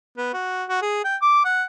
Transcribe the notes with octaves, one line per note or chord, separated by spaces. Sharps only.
B3
F#4
F#4
G#4
G5
D6
F#5